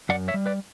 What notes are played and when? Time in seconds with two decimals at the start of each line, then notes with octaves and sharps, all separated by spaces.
0.09 F#2 D5 F#5
0.28 C#5 E5
0.34 G3
0.46 B4 D5